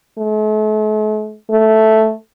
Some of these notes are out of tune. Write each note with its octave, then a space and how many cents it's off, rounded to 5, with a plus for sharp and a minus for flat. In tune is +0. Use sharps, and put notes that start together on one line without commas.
A3 -45
A3 -5